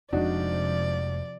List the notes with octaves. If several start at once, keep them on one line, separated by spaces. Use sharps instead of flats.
F1 C3 F3 G#3 D4 D#4 F#4 D5